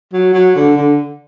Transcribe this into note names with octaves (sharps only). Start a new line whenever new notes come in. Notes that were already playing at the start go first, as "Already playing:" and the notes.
F#3
F#3
D3
D3